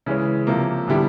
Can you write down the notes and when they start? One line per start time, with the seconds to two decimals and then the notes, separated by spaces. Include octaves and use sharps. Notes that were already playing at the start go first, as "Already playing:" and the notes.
0.06 C#3 E3 G#3 C#4
0.47 C3 F3 A#3
0.88 D3 G3 B3 E4 G4